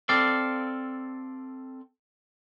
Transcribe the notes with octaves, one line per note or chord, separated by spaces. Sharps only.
C4 A4 D5 F5